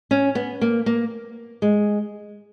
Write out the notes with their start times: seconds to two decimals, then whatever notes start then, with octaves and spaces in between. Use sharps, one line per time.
0.11 C#4
0.35 B3
0.61 A#3
0.86 A#3
1.62 G#3